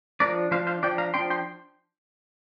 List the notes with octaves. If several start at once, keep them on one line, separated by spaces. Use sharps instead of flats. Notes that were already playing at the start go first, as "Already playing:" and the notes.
F3 D4 A#4 D5
F3 D4 C5 F5
C5 F5
F3 D4 D5 G5
F5 A#5
F3 D4 G5 C6
G5 C6